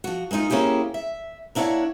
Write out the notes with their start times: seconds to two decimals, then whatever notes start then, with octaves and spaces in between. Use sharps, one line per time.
0.04 F3 F#4
0.31 G#3 A#3 D4 D#4 F4
0.50 A#3 C#4 E4 G4 G#4
0.94 E5
1.55 A#3 D4 E4 A#4 C#5 F#5